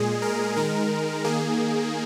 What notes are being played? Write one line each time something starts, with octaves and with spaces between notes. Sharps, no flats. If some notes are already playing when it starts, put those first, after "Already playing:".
Already playing: A#2 G#3 G#4
A#4
D#3 G#3 A#4
D#3 A#3 G#4